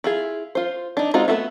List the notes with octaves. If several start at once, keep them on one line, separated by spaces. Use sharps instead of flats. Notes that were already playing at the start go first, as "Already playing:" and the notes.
E4 F4 G#4
F4 C5
D4 D#4
G#3 C4 D#4 F4 F#4
A3 B3 D#4 A4 E5